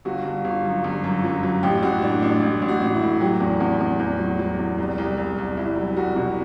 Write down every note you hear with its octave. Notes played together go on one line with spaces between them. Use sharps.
G1 F#4
G1
G1
F#2
G1
F#2
F#3
F#3
A1 G4
A1 F#4
A2 D4
A1 D4
A1
A1
F#4
A1
E4
A2
F#3 G4
E2
E2
E2
E2
F#3
F#3
E2
C2
C2
C2
C2
C2 E4
F#3
C2 F#4
B2